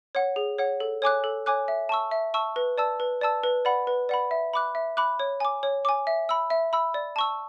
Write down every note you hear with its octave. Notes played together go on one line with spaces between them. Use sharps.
C#5 F#5
G#4
C#5 F#5
A4
C#5 G#5 D6 F#6
A4
C#5 G#5 D6 F#6
E5
A5 C#6 E6
E5
A5 C#6 E6
B4
D5 A5 E6
B4
D5 A5 E6
B4
D5 F#5 B5
B4
D5 F#5 B5
E5
B5 D6 F#6
E5
B5 D6 F#6
C#5
G#5 D6
C#5
G#5 D6
E5
B5 E6
E5
B5 E6
D5
A5 C#6 E6